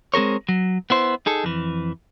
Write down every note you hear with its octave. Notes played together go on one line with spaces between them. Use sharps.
G#3 C4 G#4 A#4 C#5
F#3
B3 E4 C5
D#4 G#4 A4
F2 E3